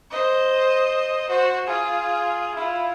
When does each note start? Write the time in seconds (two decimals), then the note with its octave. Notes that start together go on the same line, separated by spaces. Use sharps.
0.11 C5 D#5
1.29 F#4 C5
1.67 F4 G#4
2.55 E4 F4